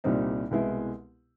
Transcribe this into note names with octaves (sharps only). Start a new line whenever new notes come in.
C2 A#2 G3 C4 D#4
C2 B2 G#3 B3 E4